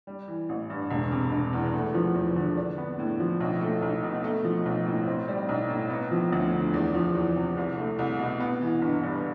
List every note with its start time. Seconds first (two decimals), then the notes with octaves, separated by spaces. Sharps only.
0.07 G3
0.28 E3
0.49 A1
0.70 G2
0.91 E1
1.12 C3
1.32 E1
1.53 E2
1.74 A3
1.94 F3
2.15 E2
2.36 D3
2.57 D4
2.78 B3
2.99 A2
3.20 F3
3.40 B1
3.61 A3
3.82 B1
4.03 B2
4.24 A3
4.44 F3
4.66 B1
4.87 A2
5.07 C4
5.28 G3
5.49 B1
5.69 A2
5.90 B3
6.11 F3
6.33 D2
6.53 D3
6.74 E2
6.94 F3
7.15 E2
7.36 C3
7.57 C2
7.78 A3
7.99 C2
8.19 B2
8.40 B3
8.61 E3
8.82 G1
9.03 G2